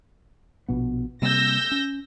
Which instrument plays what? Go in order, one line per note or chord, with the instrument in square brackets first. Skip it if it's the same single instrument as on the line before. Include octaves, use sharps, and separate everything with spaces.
[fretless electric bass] A#1 B2 B3
[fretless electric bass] C3 G3 A#3 [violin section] E6 G6 A#6
[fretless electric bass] C#4